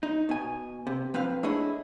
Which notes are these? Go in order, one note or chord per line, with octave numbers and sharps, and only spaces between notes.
D#4
B2 G#5
C3
F2 C4 B4 F5
A3 D4 E4 G#4 C#5 D#5